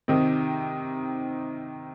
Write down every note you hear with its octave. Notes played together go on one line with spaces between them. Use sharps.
C3 D#3 C4 D#4